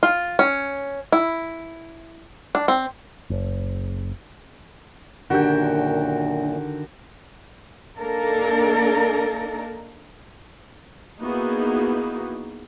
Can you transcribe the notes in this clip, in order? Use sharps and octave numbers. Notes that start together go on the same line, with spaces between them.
F4
C#4
E4
D4
C4
F#1
F#2 A#2 D3 D#3 D4 F#4 G4 G5
A#3 D4 D#4 A4 A#4
A#3 B3 D#4 E4 F#4 G#4